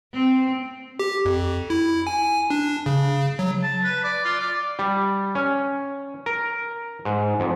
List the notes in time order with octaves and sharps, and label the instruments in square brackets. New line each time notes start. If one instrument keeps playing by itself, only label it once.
[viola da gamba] C4
[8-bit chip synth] G4
F2
E4
G#5
D4
C#3
F#3
[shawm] A5
B4
D5
F4
D5
[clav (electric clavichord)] G3
C#4
A#4
G#2
F2